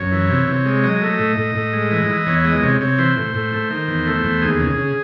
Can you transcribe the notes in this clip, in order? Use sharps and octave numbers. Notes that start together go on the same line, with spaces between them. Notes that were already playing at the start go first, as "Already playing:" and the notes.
Already playing: F#2 C#5
E3
C3
C3
G#3
F#3 D#5
A3
A2
A2
A2
G#3
E3
E3
E2 C#5
G#3 D#5
C3 C#5
C3 C#5
E3 C5
A2
A2
A3
D#3
E2
A3
E2
D#2 G#4
C#3
C#3